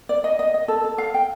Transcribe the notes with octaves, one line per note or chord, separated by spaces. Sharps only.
D5
D#5
D#5
D#5
A4
A4
F5
G5